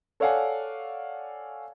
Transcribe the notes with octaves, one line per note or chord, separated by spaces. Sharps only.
A4 C#5 D5 F5 F#5 G#5